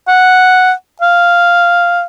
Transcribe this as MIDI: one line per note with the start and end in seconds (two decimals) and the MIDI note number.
0.08 0.72 78
1.02 2.05 77